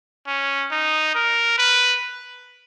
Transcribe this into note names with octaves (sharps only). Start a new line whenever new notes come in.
C#4
D#4
A#4
B4